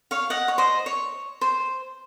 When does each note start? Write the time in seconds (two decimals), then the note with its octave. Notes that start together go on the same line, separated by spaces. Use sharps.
0.11 C#5 F5
0.30 D#5 F#5
0.48 C#5
0.58 C5 D#5
0.86 C#5
1.41 C5